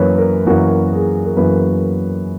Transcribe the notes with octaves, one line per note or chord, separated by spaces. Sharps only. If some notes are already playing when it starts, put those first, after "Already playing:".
Already playing: F#2 E3 A#3 A#4 B4 C#5
A#4
F#2 E3 A#3 F#4
G#4
A#4
F#2 E3 A#3 B4